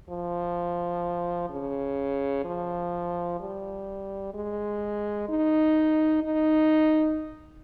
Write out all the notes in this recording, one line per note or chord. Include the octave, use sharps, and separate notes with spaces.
F3
C#3
F3
G3
G#3
D#4
D#4